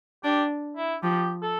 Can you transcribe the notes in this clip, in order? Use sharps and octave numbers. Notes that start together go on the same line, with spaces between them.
D4 G4
E4
F3 G4
A4